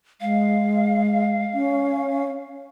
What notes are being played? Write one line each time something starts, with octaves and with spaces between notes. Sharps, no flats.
G#3 F5
C#4